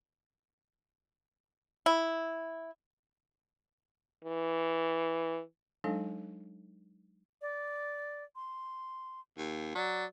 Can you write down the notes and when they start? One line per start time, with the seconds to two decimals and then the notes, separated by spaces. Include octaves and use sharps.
1.86 E4
4.24 E3
5.84 F#3 G#3 D4 D#4 A4 F5
7.42 D5
8.36 C6
9.38 D#2
9.75 F#3 D5